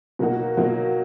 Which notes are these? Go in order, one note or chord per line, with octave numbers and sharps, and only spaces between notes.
B2 F#3 A#3 D#4 F#4
B2 F#3 A#3 D#4 F#4